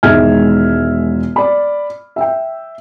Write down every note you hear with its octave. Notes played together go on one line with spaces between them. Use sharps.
E1 D#3 G#3 E5 F6 G#6
D5 B5
E5 G5